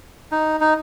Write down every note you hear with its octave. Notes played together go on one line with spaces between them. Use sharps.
D#4
D#4